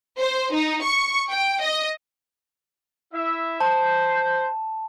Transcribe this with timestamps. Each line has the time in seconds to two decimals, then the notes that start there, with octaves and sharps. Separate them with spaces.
0.19 C5
0.53 D#4
0.84 C#6
1.30 G5
1.62 D#5
3.14 E4 E5
3.60 C5 A5